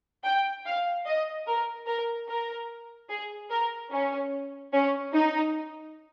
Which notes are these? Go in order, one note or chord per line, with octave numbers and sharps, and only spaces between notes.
G5
F5
D#5
A#4
A#4
A#4
G#4
A#4
C#4
C#4
D#4